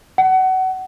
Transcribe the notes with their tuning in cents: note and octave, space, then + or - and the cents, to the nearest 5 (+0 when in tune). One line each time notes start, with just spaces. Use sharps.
F#5 +25